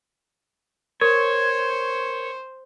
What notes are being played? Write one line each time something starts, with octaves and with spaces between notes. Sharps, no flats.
A#4 C5 C#5